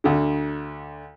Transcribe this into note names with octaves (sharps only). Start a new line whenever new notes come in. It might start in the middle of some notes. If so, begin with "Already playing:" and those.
D2 D3